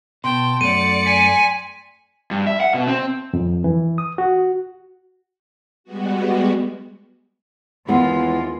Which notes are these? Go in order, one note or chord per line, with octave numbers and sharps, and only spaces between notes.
B2 G5 A5 C6
F#2 A3 D5 C#7 D#7
G#5 B6
G2
E5
F#5
B2
C4
F2
E3
D#6
F#4
G3 G#3 B3 F#4
D#2 E3 G#3 B3 F4